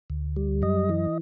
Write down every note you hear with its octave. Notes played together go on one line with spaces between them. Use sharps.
D2
G3
F#2 D#5
E3